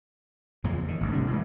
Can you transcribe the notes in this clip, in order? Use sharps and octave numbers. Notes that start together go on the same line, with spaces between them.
E2 A#2 C#3 F3
E2 D#3
G#1 D2
A2 C3 G3 D4
A#2 E3 G#3 A3